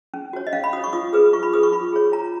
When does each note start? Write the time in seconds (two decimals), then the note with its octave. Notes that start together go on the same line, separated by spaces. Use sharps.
0.14 C#4
0.33 F#4 C#5
0.47 D#5
0.53 C#4 F5
0.64 B5
0.73 F#4 D#6
0.77 C#5
0.84 C#6
0.93 F4 D#6
1.13 G#4 B4 D#6
1.33 F4 C#6
1.43 B5
1.53 G#4 B4 D#6
1.63 C#6
1.72 F4 B5
1.93 G#4 C#5
2.12 F4 A#5